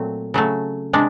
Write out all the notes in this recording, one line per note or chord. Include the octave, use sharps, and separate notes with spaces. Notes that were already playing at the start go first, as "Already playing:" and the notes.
Already playing: A#2 F#3 A3 C4
C#3 F#3 A3
C3 G#3 D4